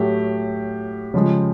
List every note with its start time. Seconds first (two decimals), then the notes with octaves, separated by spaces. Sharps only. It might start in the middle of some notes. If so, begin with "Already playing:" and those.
Already playing: A2 F#3 A3 G4
1.14 C#3 F3 G#3